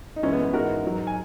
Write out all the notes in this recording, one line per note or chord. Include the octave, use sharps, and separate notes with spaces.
D#4
F#2 E3 G#3 C#4
B3
B3
G#2 E3 G#3 F#4 A#4
G#2 F#3
G#5